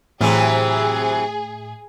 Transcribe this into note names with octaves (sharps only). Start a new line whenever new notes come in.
A2 C3 E3 F#3 G#4